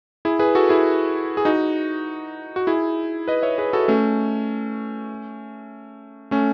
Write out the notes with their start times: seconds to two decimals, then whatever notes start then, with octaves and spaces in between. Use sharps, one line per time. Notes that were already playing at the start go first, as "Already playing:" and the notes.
0.25 E4 G#4
0.39 G#4 B4
0.55 F#4 A4
0.69 E4 G#4
1.37 G#4
1.45 D#4 F#4
2.56 F#4
2.67 E4 G#4
3.28 B4 D#5
3.43 C#5 E5
3.58 G#4 B4
3.73 F#4 A4
3.88 A3 C#4
6.31 A3 C#4